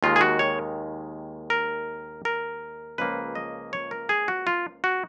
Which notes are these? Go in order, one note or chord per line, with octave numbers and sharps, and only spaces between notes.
D#2 D#3 G#3 F4
G#4
F#4
C#5
A#4
A#4
C#2 C#3 F3 A#3 B4
D#5
C#5
A#4
G#4
F#4
F4
F#4